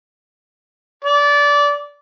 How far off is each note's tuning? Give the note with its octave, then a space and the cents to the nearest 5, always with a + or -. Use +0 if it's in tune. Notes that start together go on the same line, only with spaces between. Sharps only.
D5 -20